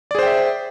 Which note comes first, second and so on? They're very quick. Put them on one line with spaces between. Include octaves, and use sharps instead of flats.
D5 G#4 C5 G5 E5